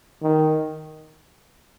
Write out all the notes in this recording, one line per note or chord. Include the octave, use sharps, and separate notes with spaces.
D#3